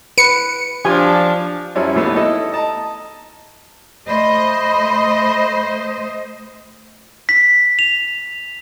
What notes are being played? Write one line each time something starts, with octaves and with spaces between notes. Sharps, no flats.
B4 C#7
F3 D4 G4 G#5
F#2 F3 G3 C#4 E4
D#2 E3 G3 A3 B3 E6
D#4 E4 A4 D#5
D#5 A5 A#5
A3 C5 D#5 B5
B6
F7